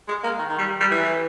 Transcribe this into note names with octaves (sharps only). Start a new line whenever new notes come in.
G#3
A#3
D#3
D#3
G3
G3
E3